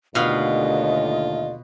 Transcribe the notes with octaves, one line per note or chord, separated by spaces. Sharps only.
D#2 B2 D3 A3 F4 D#5 F5